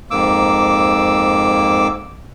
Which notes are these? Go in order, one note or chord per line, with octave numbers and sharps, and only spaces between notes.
F2 G#2 A#3 D6 E6